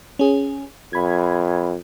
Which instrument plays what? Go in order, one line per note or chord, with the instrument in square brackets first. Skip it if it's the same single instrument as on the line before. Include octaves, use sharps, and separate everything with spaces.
[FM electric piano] C#4 G#4
[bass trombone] F2 [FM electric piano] B5 G#6